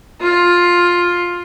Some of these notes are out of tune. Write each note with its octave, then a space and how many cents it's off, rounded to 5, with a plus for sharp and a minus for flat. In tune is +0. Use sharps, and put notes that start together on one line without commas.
F4 +10